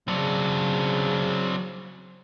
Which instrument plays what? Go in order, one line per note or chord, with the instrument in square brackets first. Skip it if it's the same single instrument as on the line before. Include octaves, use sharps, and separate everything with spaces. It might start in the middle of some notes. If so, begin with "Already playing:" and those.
[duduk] C#3 [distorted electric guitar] F#3 [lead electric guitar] C4 D4